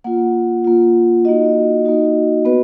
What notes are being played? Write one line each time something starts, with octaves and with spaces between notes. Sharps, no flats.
A#3 F4 F#5
A#3 F4
A#3 D#4 F#4 D#5
A#3 D#4 F#4
B3 F#4 B4